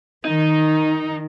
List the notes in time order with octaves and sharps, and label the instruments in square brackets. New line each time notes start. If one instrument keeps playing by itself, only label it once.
[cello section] D#3 [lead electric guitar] D#4